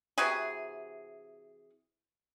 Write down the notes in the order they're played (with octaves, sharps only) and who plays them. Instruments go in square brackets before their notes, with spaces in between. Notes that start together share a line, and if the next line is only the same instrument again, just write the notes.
[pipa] C3 E3 F#4 G#4